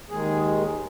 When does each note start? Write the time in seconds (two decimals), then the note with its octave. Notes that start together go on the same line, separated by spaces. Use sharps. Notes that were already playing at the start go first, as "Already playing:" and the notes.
0.09 D#2 D#3 G#3 G#4